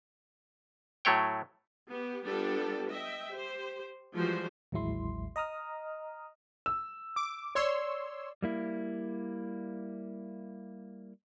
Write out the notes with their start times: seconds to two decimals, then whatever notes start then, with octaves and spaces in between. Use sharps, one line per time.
1.05 A2 F#3 A3 C#5 G5
1.91 B3 G4
2.25 G3 B3 D4 F4 G4 A4
2.89 D#5 E5 G5
3.30 G4 C5
4.15 E3 F3 G3 G#3 F#4 C5
4.72 A1 D#2 F#3 G#3 E4 C6
5.36 D#5 A#5 D#6 F6
6.66 E6
7.16 D6
7.55 C#5 D5 C6 E6
8.43 G3 A#3 E4